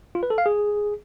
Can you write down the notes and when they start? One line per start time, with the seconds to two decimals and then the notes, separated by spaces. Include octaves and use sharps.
0.15 F4
0.23 B4
0.30 A4
0.38 F5
0.46 G#4